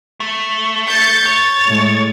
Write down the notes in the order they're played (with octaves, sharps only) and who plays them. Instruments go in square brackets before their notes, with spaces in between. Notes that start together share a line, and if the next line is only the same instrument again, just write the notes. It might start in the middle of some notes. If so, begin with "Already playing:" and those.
[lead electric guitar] A3
[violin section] G6 A6 C#7
[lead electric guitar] C#5 [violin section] A6
[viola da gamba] A2 G#3